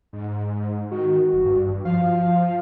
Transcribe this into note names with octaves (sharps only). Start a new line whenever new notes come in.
G#2
D#3 F#4
G1
G2
F3 F5